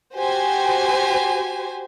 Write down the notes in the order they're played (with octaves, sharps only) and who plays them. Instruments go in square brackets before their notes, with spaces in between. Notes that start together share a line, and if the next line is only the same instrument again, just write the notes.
[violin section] F#4 G4 C5 G#5